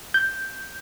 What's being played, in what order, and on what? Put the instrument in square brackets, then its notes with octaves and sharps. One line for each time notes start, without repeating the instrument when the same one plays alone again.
[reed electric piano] G6